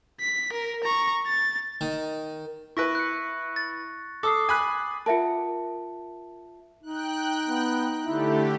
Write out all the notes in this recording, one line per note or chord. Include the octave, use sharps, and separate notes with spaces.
B6
A#4
A#5 C#6
A6
D#3
E4 B4 C#6 A#6
F#6 C#7
A6
A4 D6 D#6 C7
G#5 B5 F#6
F4 A#4 E5 F#5 A5
D#4 G5 F#6
B3
D3 A3 E4 G4